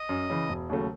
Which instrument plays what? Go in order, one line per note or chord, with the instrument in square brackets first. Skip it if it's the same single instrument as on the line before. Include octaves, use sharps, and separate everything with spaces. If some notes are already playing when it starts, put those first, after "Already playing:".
Already playing: [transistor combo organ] D#5
[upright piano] F#2
C#3 E3
E1
D#2 C#3 F#3 A3